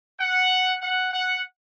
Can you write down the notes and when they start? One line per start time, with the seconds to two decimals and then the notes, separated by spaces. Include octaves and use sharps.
0.19 F#5
0.81 F#5
1.13 F#5